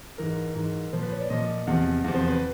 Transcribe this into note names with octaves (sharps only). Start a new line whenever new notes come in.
G#2 E3 A#4
G#2 E3
A#2 F3 C5
B4
C#5
D5
A#2 F3 D#5
E2 C3 F3
E2 C3 F3
C5
B4